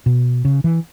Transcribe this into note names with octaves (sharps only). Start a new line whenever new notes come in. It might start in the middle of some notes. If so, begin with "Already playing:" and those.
B2
C#3
E3